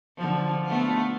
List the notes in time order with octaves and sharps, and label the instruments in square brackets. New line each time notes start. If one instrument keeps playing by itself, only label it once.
[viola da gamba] D3 F3
A3 B3 F4